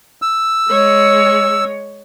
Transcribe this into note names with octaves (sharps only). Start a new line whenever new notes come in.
E6
G#3 C#5